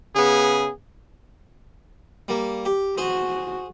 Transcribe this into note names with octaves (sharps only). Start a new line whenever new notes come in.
C#3 B3 G#4
G3 A#3
G4
F#4 G#4 C5